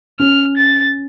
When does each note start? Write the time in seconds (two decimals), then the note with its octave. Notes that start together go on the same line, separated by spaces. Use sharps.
0.19 C#4 F6
0.57 A6